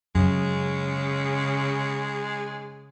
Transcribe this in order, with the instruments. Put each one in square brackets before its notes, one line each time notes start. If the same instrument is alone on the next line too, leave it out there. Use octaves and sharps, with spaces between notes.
[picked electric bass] F#2 [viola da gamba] C#3 [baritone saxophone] G#3